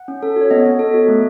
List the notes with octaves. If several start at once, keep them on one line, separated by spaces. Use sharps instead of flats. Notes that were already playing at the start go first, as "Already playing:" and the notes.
Already playing: F#5
C#4
A4
F#4 C#5
B3 D#5
B3
A4
F#4
A3